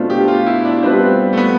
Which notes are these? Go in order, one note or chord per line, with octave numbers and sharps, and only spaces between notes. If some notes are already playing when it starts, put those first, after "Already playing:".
Already playing: B2 A3 D4 F4 C5
G4
F4
E4
D4
G3 B3 C4 F4 B4
A3
B3